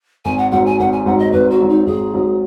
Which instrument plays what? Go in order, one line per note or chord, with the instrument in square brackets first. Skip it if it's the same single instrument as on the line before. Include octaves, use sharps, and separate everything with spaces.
[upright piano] G#1 [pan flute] G#5
[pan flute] F#5
[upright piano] G#2 F#3 [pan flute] F#5
[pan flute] G#5
[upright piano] G#1 [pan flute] F#5
[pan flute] G#5
[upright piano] G#2 F#3 [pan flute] F#5
[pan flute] D#5
[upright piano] G#1 [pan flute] B4
[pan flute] F#4
[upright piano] G#2 F#3
[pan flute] D#4
[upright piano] G#1 [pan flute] G#4
[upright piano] G#2 F#3